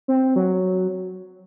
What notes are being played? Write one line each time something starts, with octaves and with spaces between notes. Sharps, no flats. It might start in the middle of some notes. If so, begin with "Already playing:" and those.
C4
F#3